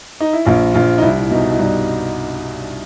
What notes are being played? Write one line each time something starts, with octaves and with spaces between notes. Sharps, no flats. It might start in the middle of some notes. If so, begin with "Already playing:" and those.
D#4
E4
A#1 F4
A#1 F4
D#4
C2 E4
B2 D#4
E4
G2 D#4